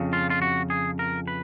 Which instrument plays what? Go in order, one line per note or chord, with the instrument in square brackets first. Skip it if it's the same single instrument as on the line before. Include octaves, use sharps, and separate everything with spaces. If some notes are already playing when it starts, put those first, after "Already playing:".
Already playing: [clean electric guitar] F2 C#3
F4
F4
F#4
G#4
A#4
B4